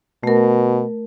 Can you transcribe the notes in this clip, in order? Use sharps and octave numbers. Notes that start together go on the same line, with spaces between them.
B2 A3 A#4